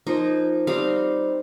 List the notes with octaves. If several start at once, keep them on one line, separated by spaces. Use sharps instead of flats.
F3 A#3 D#4
G3 C4 D#4 F5